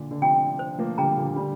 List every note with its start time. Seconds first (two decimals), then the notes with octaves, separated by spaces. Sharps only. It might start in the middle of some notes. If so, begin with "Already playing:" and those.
Already playing: A#2 D3
0.11 D3
0.22 C3 F3 G5 A#5
0.59 C5
0.78 F3 A#3
0.98 D3 G3 G5 A#5
1.17 A#2 D3
1.36 D3 G3 F4